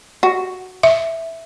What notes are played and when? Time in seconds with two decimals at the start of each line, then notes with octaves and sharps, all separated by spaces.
0.23 F#4
0.83 E5